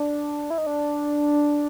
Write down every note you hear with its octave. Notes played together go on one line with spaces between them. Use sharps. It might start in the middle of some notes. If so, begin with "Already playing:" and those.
Already playing: D4
E4
D#4
D4